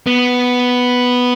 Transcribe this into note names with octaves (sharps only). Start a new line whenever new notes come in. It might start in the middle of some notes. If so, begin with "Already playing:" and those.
B3